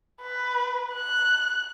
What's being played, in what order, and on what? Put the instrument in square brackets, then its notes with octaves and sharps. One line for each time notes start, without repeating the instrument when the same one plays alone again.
[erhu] B4
F#6